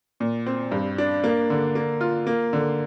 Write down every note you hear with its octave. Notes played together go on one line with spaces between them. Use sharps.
A#2
C4
G2
D4
A#3
D3
A#3
F4
A#3
D3